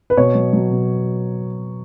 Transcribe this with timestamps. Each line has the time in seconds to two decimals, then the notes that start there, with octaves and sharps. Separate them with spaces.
0.10 B4
0.17 B2 C#5
0.35 F#3
0.53 F#3
0.70 B2